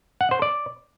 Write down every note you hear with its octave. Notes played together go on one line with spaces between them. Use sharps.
F#5
C5
D5